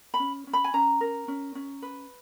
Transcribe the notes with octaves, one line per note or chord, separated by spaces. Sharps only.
B5
C#4
C#4
B5
G#5
C#4 A#5
A#4
C#4
C#4
B4